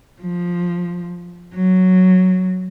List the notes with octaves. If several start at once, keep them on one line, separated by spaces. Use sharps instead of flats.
F3
F#3